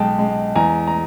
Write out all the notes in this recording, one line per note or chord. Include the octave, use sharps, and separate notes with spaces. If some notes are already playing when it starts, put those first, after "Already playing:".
Already playing: B1 G#3 G5 A5
G#3
E2 G#5 A#5
A#5